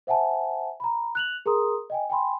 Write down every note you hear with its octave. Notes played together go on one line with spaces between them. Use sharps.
C5 E5 F#5 G#5 A5
A#5 B5
F#6 F7 F#7
G#4 A#4 A#5 C6 D#6
D#5 G5 G#5
G5 G#5 B5 C6